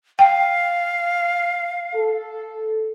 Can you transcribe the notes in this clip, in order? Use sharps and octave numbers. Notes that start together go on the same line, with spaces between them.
F5 G5
A4